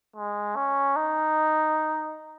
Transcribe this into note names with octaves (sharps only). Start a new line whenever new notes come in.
G#3
C#4
D#4